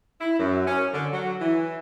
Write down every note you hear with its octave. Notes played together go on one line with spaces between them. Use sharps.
E4
F#2
C#4
D3
F#3
E3